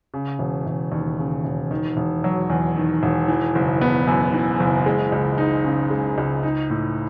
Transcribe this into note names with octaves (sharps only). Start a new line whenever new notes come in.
C#3
E1
E1
D#2
C#3
E1
D#3
E1
F#3
E2
D#3
E1
E3
F#1
B3
F#2
E3
F#1
G#3
C#2
D#4
C#3
G#3
C#2
D#4
A2